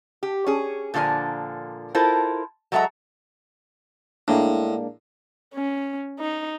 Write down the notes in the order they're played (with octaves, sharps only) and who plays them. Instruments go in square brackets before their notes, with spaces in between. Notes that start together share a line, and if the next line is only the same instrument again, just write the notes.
[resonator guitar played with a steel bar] G4
C#4 G#4
A#2 D3 F3 G3 A#4 G#5
E4 F4 A4 A#4 C5
F#3 G#3 A4 E5 F#5 A#5
[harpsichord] A2 [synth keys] G#3 A#3 D4
[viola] C#4
D#4